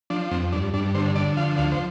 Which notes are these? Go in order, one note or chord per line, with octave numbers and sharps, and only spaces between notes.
F3 D4
F2 C4
G2 D4
G2 D4
D3 C5
D3 D5
F3 F5
D2 F5
C5